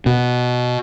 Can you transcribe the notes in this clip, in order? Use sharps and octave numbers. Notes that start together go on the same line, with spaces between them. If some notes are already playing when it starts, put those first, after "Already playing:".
B2